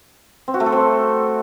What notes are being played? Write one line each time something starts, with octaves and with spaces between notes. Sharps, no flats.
C4
F#4
A3
A4
C4